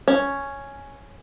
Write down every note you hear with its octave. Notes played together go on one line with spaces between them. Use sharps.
C#4